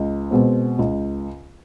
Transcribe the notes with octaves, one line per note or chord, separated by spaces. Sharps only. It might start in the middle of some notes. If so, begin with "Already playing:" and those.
Already playing: C#2
B2 G#3 C4
C#2